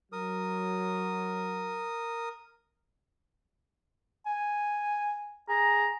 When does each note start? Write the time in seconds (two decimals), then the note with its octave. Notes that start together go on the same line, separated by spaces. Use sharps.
0.12 F#3 A#4 D#6
4.26 G#5
5.49 G#4 A#5